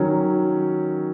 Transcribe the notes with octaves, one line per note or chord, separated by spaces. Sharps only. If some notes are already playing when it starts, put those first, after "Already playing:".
Already playing: D#3 F#3 C#4